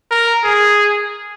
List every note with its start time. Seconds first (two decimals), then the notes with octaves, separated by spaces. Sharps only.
0.11 A#4
0.44 G#4